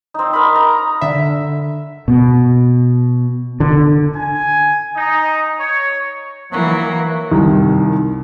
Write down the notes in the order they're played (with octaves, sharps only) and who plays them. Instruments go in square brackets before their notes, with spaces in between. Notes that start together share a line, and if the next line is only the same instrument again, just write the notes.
[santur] C4 D#4
A#4 D#5 B5
A#5
[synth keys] D3 E5
[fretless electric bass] B2
D3
[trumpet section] G#5
D#4
C#5
[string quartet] E3 A#3 [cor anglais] F#3
[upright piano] C2 D#3